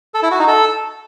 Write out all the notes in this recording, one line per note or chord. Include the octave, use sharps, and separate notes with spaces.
A4
E4
F#4
D#4
A4